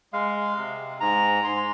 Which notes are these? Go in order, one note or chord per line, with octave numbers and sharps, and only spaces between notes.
G#3 F5
C3
G#2 A#5
G#2 C6